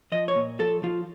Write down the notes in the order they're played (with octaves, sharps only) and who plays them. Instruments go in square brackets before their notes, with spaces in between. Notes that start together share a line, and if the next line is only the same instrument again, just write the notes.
[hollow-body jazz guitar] F3 D#5
C#5
A#2
F3 A4
F3 F4